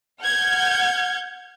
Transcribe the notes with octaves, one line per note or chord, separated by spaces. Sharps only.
F#5 F6 G6 G#6